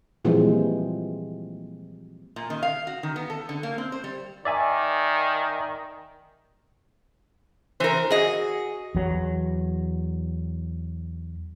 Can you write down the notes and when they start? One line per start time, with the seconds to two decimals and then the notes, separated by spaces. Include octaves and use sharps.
0.25 A#2 E3 F3 G3 G#3 C4
2.36 A#2
2.50 D#3
2.63 F5
2.87 F#4
3.03 D#3
3.16 B3
3.30 A4
3.49 D3
3.63 A#3
3.78 C4
3.92 C5
4.04 G3
4.45 D#3 D5 E5 G#5
7.80 E3 A#4 C5
8.10 F#4 G#4 D#5
8.95 E2 F#3